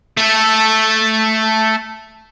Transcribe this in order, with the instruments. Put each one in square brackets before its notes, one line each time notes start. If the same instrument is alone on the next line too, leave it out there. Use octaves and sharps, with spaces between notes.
[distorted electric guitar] A3 A4